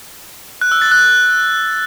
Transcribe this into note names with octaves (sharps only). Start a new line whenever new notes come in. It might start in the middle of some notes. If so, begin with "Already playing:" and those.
F#6
E6
A6
F#6